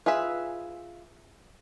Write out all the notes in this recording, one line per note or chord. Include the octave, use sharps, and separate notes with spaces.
F4 G#4 B4 E5